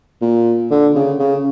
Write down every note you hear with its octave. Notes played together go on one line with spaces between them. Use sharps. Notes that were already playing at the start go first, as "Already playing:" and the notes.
A#2
D3
C#3
C#3